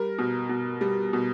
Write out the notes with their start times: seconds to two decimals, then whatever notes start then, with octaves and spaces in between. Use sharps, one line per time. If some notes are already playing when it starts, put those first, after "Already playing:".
Already playing: G3 A#4
0.18 B2
0.49 B2
0.81 G3
1.13 B2